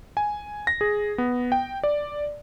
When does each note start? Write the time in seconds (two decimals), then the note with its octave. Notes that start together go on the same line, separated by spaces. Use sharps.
0.17 G#5
0.67 A#6
0.81 G#4
1.18 B3
1.52 G5
1.83 D5